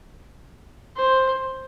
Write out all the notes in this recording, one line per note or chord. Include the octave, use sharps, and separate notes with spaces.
C5